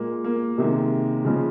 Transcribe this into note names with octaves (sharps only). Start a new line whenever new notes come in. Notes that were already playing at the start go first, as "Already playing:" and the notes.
Already playing: A#2 G#3 A#3
A#3
C3 D#3 G#3
C#3 F3 G#3